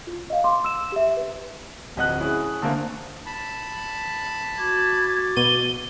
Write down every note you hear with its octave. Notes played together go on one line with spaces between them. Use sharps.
F4
D#5 F5
C6 D6
E6 E7
G4 E5
B4
D1 F2 D#5 F#5 F#6
C#4 E4 G#4
D3 A3 A#3 C4
A5 B5
F#4 D6 G#6 A6
B2 D#7 G7